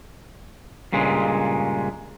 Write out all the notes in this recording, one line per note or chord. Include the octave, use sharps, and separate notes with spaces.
G2 A#2 C#3 G#3